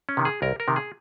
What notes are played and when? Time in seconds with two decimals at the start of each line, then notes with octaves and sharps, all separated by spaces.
0.09 C#4
0.17 C3 D#3
0.25 G#4
0.42 C2 A#4
0.60 A#4
0.68 C3 D#3
0.76 G#4